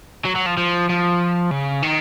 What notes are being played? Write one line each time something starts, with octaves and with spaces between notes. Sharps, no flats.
F#3
F#3
F3
F3
F3
C#3
D#3